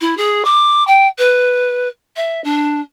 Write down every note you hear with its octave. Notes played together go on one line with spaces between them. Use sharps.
E4
G#4
D6
G5
B4
E5
D4